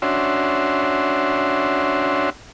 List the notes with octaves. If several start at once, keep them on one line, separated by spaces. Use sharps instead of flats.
C#4 D4 F#4 E5 C6